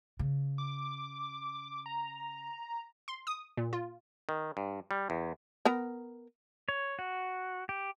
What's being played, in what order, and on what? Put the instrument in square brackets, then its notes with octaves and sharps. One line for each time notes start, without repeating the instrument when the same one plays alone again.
[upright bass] C#3
[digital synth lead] D6
A#5
[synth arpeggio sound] C6
D#6
A#2
F4
[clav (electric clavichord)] D#3
G2
G3
E2
[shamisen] B3 A#4 A#5
[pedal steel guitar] C#5
F#4
G4